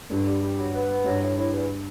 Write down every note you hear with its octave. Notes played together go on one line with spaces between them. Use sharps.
G2 D3
G3
G3
F#3
B3
B3
G2 F#3
A2
A2
E2